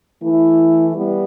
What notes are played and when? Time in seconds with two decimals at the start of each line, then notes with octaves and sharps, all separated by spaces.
0.22 E3 A3 E4
0.95 G3 B3